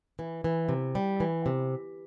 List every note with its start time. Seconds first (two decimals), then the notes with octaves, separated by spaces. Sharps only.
0.19 E3
0.44 E3
0.69 C3
0.95 G3
1.20 E3
1.46 C3